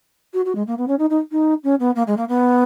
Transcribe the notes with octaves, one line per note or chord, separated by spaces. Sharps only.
F#4
F#4
G#3
A#3
B3
C#4
D#4
D#4
D#4
C#4
B3
A#3
G#3
A#3
B3